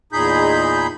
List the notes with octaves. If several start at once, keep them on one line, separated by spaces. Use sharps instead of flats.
E2 A#2 D#4 G#4 B5 G6